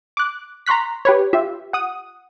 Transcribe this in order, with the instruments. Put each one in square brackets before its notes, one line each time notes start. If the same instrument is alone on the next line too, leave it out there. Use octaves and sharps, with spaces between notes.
[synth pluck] D6 F#6
A#5 C6 C#6 F#6 B6
G4 B4 C#5
F4 G4 E5
F#5 D#6